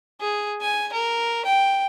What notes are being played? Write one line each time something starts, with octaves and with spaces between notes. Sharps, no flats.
G#4
G#5
A#4
G5